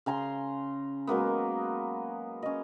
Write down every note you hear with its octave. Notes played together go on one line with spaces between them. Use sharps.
C#3 G#5 A#5 C6
F#3 G#3 A#3 B3
C#4 D#5